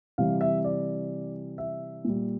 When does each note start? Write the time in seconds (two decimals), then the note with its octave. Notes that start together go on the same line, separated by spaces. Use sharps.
0.18 C3 E3 G3 F5
0.41 E5
0.64 D5
1.58 E5
2.05 A#2 G3